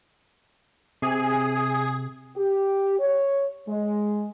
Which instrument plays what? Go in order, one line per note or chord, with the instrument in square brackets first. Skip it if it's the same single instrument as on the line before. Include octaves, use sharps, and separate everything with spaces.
[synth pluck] C3 [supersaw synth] G#4
[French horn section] G4
C#5
G#3